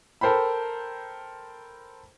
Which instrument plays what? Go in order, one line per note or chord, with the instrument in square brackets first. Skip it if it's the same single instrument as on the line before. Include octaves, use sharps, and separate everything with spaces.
[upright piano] A4 A#4 C5 G5 B5